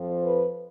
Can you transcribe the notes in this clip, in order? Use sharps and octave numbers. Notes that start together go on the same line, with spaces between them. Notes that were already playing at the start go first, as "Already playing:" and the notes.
Already playing: F2 F3
B4